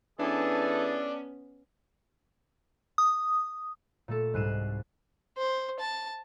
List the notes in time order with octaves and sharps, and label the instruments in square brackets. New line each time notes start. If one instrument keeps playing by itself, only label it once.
[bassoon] E3 [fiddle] B3 C#4 [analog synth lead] D4 [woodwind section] G#4 A4
[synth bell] D#6
[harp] A#2 A3 A4
C2 G#2 F#6 C7 D#7 E7
[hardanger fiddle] C5
A5